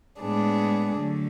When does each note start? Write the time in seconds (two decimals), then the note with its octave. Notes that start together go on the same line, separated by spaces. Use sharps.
0.20 A2 G#3 B3 D4 G#4
0.97 D3 F#3 A3